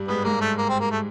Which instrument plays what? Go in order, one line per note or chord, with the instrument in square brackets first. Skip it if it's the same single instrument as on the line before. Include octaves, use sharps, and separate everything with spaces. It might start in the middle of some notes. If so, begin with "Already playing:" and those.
Already playing: [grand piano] G2 G3
[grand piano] G#2 G#3 [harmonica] B3
[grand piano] G#2 G#3 [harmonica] A#3
[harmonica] A3
A#3
C4
A#3
A3